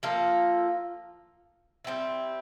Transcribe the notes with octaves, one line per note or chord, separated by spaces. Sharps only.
F3 A#3 F4 A4
G3 C4 E4